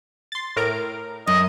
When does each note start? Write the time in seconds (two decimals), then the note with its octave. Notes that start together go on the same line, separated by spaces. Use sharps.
0.32 C6 A6
0.56 A2 A#4 D7
1.27 F#2 D#5